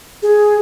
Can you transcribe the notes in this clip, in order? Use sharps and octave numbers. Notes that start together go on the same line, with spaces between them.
G#4